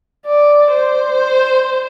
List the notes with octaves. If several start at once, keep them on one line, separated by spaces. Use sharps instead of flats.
D5
C5